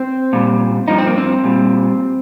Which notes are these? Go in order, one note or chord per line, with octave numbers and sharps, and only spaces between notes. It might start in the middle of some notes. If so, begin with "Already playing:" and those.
Already playing: C4
A#2 G3
G2 F3 D#4
C4
A#3
C4
A#2 G3